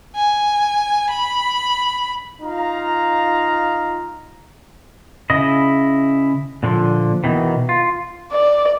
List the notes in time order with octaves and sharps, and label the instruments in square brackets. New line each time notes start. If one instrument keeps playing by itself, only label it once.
[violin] G#5
B5
[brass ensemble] D#4 F4 F5 A#5
[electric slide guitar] C#3 E4 D#5
A#2 D3 F3
B2 D#3 E3
F4
[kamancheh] D5